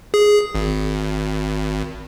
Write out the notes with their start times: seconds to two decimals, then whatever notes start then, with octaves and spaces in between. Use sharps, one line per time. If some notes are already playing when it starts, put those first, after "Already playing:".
0.14 G#4
0.55 G#1